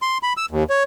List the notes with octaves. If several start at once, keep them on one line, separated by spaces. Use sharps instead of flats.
C6
B5
E6
D#2
C#5